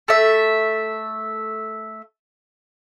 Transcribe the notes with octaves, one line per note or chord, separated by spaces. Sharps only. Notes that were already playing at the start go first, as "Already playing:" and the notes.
A3 E5